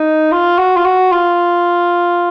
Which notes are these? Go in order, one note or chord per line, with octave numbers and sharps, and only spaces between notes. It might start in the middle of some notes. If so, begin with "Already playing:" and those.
Already playing: D#4
F4
F#4
F4
F#4
F4